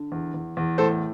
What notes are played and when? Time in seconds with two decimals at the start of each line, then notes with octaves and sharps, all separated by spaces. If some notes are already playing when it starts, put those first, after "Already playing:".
Already playing: D3
0.12 E2
0.34 E2
0.57 E2
0.78 A2 A4 C5